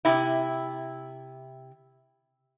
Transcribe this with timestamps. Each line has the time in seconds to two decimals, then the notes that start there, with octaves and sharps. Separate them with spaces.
0.05 C3 E4